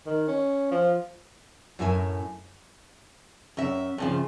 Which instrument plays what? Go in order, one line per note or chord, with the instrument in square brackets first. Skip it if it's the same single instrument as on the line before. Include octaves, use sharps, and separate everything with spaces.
[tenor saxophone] D#3
C#4
F3
[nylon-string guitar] F#2 A2 E4 A#4 E5 G#5
[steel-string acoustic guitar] F#2 E5
G2 C#3 F3